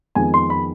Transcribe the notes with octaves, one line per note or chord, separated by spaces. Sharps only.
F2 D#3 G#3 B3 G#5
C6
B5